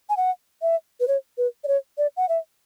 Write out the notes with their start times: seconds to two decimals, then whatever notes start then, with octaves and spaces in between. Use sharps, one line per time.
0.09 G#5
0.17 F#5
0.62 E5
1.00 B4
1.08 C#5
1.38 B4
1.64 D5
1.68 C#5
1.98 D5
2.17 F#5
2.29 E5